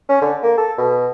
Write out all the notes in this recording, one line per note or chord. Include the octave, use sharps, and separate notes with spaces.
C#4
D3
A#3
A4
B2